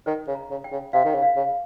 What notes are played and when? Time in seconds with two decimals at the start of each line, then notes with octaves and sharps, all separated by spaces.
0.06 D#3 C5
0.28 C#3
0.35 A#5
0.50 C#3
0.64 G5
0.72 C#3
0.93 C3 F5
1.05 D#3
1.15 C#3
1.22 F5
1.36 C#3